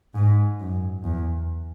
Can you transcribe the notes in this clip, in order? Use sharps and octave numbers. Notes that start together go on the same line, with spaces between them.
G#2
F#2
E2